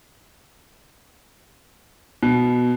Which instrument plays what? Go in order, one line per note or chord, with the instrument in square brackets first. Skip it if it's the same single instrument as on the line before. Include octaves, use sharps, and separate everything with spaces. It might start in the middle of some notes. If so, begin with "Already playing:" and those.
[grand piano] B2